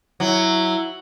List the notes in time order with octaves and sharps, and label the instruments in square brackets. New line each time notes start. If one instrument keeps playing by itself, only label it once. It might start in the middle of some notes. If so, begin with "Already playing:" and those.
[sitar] F#3 [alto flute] E4